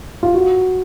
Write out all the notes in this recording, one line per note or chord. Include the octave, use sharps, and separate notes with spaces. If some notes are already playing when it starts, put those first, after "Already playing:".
F4
F#4